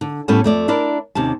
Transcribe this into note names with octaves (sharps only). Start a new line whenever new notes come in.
D3
A2 G3 B3 C#4 A4 A5
F2 A3 D5
D4 E4 A#4 D5
D#2 C3 C#4 A5